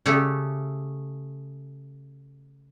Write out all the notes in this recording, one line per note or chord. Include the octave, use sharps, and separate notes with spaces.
C#3 A3 G4 A4